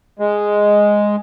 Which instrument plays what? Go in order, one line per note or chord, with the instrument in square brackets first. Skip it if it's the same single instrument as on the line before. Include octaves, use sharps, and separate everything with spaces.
[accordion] G#3